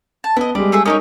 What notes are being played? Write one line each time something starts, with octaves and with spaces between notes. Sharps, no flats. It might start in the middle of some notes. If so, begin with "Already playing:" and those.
A5
B3 E4 D#5
G3 G#3 D5
A3 G#4 E5
C#4 D#4 G4 A#4 C#5 D#6